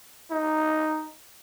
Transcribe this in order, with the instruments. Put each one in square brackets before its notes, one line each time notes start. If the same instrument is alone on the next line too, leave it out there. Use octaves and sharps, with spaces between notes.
[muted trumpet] D#4